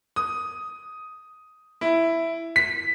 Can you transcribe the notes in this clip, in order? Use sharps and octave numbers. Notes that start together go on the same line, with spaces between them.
D#6
E4
B6